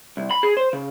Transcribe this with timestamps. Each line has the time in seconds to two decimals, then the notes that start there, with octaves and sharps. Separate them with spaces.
0.17 C2
0.31 B5
0.43 G#4
0.57 C5
0.73 C#3